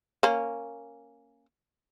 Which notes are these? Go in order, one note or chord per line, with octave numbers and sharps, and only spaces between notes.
A#3 C#4